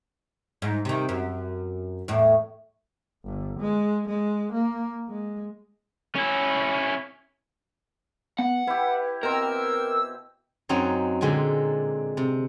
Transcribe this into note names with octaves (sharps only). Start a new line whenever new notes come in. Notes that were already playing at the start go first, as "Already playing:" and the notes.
G#2
C3 D#3
F#2
E2 A2
G1
G#3
G#3
A#3
G#3
C#4 E4
B3 F#5
E4 G4 B4
B2 C4 A#4 E6
F#2 F#3 C4 D#4 C#5
A#2 D3 G#3 C4 G#5
C3